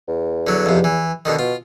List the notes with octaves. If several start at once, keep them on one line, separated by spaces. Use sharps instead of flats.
E2
D3 F#3
F2 C3
E3
B2 D3 D#3
B2 F4